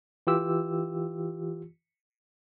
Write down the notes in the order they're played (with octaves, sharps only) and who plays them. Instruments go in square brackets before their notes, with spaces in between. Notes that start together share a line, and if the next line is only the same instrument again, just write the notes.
[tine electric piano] E3 F4 G4 E6